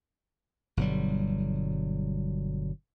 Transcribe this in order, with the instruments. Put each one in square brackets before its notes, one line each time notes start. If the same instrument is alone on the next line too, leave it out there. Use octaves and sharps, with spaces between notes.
[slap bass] G1 B2 F#3 G3